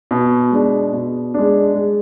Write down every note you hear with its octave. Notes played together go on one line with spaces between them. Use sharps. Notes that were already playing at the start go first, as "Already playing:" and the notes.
B2
G#3 D4
B2
G#3 D4
G#3